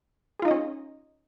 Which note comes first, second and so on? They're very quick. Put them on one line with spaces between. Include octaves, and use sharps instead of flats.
G#4 F4 D#4 D#5 C#4